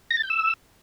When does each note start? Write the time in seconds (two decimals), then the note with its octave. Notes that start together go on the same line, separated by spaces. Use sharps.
0.11 A#6
0.17 A6
0.23 G6
0.30 E6